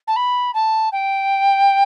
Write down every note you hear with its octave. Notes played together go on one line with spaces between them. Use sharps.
A5
B5
A5
G5